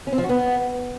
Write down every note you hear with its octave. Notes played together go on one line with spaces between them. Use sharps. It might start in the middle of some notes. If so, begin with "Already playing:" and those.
C#4
C4
F3
F#4
B3